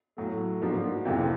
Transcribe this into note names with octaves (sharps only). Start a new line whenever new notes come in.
A2 F#3 A3
G#2 F3 A#3 D4 F#4
F2 C3 E3 G#3